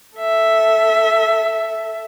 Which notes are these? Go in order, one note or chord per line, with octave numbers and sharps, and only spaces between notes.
A4 E5